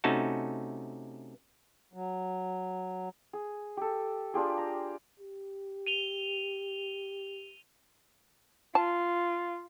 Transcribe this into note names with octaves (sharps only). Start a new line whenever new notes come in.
C3 A3 C#4 D#4 F#4 A5
F#3
G#4
G4 A4
D4 F4 G4 G#4
A#5
G4
D#7 F7 G7
F4 A5